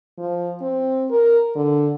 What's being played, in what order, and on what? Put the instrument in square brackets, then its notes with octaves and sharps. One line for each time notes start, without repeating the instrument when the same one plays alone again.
[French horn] F3
C4
A#4
D3